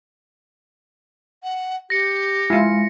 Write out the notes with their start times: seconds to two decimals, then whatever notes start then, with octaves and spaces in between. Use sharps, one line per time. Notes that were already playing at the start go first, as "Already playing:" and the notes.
1.43 F#5
1.90 G4 A#6 C#7
2.50 G#3 E4 F4